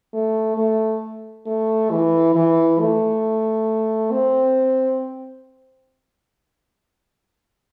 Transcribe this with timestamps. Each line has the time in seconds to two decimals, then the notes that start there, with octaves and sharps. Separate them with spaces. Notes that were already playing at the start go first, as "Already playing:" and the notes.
0.14 A3
0.58 A3
1.47 A3
1.91 E3
2.35 E3
2.80 A3
4.11 C4